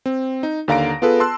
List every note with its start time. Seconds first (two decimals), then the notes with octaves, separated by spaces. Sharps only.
0.06 C4
0.43 D#4
0.68 D#2 D3 F5 A#5 A#6 D7
1.02 B3 F4 G#4 A4 B4
1.20 A5 C6 E6 F#6